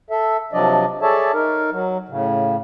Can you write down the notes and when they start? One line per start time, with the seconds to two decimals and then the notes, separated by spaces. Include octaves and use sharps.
0.10 A4 E5
0.53 C3 F3 F#3 D4 D5 D#5
1.02 G#4 A4 C#5 D5 E5 A5
1.33 D#4 A#4
1.72 F#3
2.09 A2 C#3